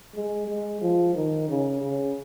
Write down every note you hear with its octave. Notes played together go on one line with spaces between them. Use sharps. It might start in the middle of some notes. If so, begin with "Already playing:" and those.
G#3
G#3
F3
D#3
C#3
C#3